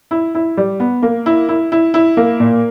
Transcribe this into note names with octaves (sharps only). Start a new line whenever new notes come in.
E4
E4
G3
B3
A#3
E4
E4
E4
E4
A#3
A#2